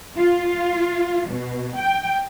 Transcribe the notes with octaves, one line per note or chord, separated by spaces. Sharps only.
F4
B2
G5